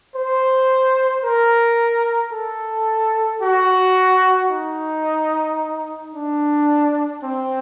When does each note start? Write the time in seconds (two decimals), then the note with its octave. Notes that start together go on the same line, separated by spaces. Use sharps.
0.15 C5
1.24 A#4
2.33 A4
3.42 F#4
4.51 D#4
6.14 D4
7.23 C4